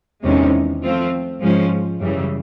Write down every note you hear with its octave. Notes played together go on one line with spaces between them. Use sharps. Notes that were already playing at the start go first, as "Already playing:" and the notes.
E2 C3 D#3 G#3 C#4
F3 A3 C4 F4
G#2 F3 G#3 C#4
F#2 C#3 E3 G3